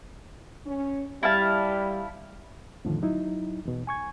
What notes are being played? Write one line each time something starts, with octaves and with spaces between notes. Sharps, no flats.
C#4
G3 E4 F5 A5
F2 A2 D3 D#3 F3
F#3 D#4 E4
E2 B2
G#5 C#6 G#6